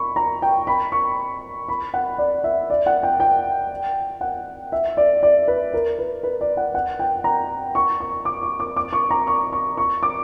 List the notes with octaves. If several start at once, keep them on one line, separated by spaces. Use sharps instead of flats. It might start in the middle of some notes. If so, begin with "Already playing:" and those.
Already playing: B5 C#6
A#5
G5
B5
C#6
B5
F#5
D5
E5
D5
F#5
G5
G5
F#5
E5
D5
D5
B4
A#4
B4
B4
D5
F#5
F#5
G5
A#5
C#6
C#6
D6
C#6
D6
D6
C#6
A#5
C#6
C#6
C#6
D6